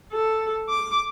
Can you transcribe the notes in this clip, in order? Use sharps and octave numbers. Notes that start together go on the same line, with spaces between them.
A4
D6